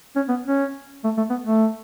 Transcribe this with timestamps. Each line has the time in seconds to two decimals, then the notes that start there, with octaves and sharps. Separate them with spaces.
0.16 C#4
0.29 B3
0.47 C#4
1.04 A3
1.17 A3
1.30 B3
1.43 A3